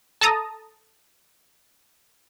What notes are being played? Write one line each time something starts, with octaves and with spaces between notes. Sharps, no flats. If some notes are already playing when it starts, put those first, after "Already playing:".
A4 A5 A#5 D#6